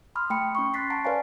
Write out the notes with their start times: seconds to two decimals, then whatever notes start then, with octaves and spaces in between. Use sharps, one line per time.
0.15 B5 C6 D#6 F6
0.30 A3 G5 B5 D#6 C#7
0.55 C#4 C#6
0.74 C6 C#6 F#6 A6 B6 C7
0.90 F#5 A5 A#5 C7 D7
1.04 B4 C#5 D5 F5 G#5 A#5